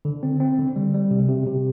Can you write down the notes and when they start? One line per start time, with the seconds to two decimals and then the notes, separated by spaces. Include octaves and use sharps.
0.05 D3
0.23 C4
0.40 C4
0.59 D3
0.76 G3
0.94 G3
1.11 C3
1.29 C3
1.47 C3